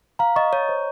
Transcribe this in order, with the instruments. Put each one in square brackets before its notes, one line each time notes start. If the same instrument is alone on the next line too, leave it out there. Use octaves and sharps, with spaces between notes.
[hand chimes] F5 [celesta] A#5
[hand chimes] D#5 [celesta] C#6
[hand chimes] C#5 [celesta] D#5
[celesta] C5